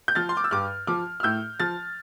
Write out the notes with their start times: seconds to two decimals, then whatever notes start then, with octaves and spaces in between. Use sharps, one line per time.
0.08 G6
0.15 F3 F6 A6
0.29 C6
0.37 D6
0.44 E6
0.51 G2 D6 F6
0.87 F3 D6 F6
1.20 F6
1.23 A2 E6 G6
1.60 F3 F6 A6